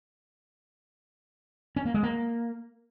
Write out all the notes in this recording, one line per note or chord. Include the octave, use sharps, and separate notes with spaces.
C#4
A#3
G#3
A#3